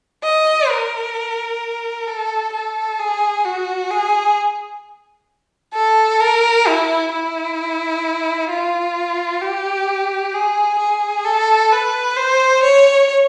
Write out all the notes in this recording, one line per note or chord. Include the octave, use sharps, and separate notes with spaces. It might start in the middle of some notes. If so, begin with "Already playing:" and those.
D#5
A#4
A4
A4
G#4
F#4
G#4
A4
A#4
E4
E4
F4
G4
G#4
G#4
A4
B4
C5
C#5